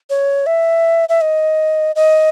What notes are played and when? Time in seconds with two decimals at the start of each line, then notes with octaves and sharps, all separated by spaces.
0.10 C#5
0.46 E5
1.09 E5
1.21 D#5
1.96 D#5